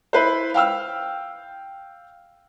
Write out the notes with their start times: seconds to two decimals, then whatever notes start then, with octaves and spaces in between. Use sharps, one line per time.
0.13 E4 B4 C5
0.54 F5 G5 E6 F6